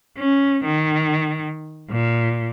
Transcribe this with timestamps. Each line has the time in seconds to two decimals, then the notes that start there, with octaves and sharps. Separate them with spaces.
0.18 C#4
0.65 D#3
1.90 A#2